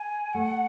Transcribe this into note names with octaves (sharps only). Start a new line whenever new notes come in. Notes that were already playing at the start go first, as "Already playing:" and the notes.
Already playing: G#5
A3 F#5